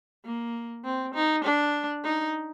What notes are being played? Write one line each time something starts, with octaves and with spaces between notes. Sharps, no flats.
A#3
C4
D#4
D4
D#4